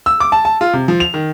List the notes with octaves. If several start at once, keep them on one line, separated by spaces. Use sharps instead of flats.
E6
D6
A5
A5
F4
C3
F3
F7
D#3